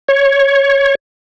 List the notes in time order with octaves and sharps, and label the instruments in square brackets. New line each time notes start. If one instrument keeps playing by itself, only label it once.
[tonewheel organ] C#5